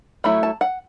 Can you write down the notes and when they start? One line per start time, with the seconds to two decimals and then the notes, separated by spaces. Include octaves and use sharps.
0.24 F#3 A3 E4 B5
0.43 A5
0.61 F#5